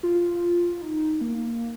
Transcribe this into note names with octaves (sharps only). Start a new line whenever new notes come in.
F4
D#4
A#3